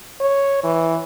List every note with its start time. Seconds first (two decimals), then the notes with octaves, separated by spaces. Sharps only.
0.21 C#5
0.64 E3